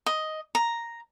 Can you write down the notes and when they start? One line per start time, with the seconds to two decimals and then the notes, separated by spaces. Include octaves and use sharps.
0.06 D#5
0.55 A#5